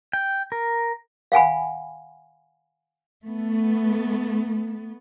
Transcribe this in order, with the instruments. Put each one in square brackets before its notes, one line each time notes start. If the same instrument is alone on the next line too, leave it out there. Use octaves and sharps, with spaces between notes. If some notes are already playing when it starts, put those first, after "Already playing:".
[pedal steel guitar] G5
A#4
[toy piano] F5 F#5 G#5 B5
[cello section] A3 B3